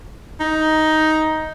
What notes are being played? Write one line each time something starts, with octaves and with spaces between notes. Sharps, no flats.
D#4